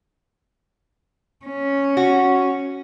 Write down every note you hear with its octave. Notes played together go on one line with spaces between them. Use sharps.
C#4
F#4